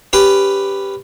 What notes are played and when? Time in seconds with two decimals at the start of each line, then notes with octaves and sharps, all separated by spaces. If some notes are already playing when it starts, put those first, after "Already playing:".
0.13 C#4 G4 B4